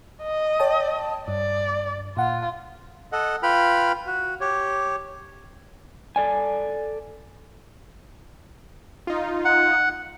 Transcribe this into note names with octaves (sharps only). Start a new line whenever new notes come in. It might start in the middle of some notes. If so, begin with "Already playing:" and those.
D#5
C#5 G5 A5
G2 D5
A#2 F4 F#5
A4 D#5 F#5
F4 B4 G5 B5 F6
F#4
G4 C#5
A4 D5 G#5
D#4 F4
F#5